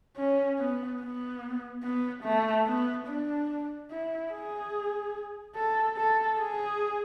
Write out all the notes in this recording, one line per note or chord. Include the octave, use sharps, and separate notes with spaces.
C#4
B3
B3
B3
A3
B3
D4
E4
G#4
A4
A4
G#4